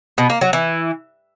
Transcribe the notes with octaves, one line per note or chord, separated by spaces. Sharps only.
B2
A#3
F#3
E3